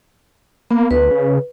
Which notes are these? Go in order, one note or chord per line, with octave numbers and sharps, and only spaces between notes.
A#3 B3
D2 B4
C#3